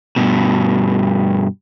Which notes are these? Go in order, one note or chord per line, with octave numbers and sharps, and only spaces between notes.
G2 B2